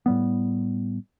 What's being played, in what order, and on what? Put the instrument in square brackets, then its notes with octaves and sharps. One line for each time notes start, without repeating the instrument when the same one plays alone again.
[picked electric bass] A2 G3 B3